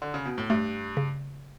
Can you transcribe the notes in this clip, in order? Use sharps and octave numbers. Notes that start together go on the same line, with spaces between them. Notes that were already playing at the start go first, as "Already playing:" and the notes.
D3
C#3
B2
A2
G2 A3
C#3